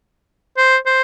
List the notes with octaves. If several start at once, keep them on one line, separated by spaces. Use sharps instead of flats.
C5
C5